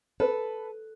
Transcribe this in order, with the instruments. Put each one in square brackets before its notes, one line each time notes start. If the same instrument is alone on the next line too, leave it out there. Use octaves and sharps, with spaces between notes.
[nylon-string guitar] A4 [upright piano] B4